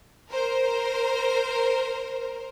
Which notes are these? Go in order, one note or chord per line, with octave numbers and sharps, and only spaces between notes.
A#4 C5